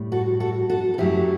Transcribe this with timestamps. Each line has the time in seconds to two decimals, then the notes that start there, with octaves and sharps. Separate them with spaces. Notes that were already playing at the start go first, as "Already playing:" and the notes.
Already playing: A2 G3
0.12 F#4 A4
0.40 F#4 A4
0.70 F#4 A4
0.94 A4
0.98 F#2 F#3 A3 E4 G4